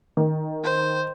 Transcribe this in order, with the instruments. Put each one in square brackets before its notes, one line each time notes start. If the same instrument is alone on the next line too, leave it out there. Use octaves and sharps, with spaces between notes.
[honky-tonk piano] D#3
[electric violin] C5